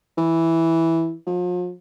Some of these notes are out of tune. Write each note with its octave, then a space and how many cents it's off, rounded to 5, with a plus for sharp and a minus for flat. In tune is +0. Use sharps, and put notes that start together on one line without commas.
E3 -5
F3 +40